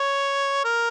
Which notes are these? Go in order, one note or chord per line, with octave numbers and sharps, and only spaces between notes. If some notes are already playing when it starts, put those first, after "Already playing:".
Already playing: C#5
A#4